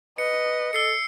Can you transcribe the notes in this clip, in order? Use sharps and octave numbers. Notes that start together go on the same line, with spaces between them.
B4 D#5 C#7
A4 E6 C7 C#7